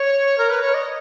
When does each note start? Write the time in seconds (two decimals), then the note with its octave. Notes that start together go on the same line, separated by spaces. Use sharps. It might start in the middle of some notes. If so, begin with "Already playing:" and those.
Already playing: C#5
0.38 A#4
0.50 B4
0.62 C#5
0.74 D#5